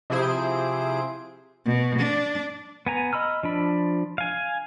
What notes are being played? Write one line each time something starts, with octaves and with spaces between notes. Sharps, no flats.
C3 F3 E4 G#4 C5 D7
B2
D4
B3 G#5 A#5
D#5 B5 E6 F6
F3 D4 B5
F5 G#5